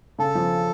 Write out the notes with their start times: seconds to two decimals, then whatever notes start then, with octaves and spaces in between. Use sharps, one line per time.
0.19 C#3 A4
0.35 F3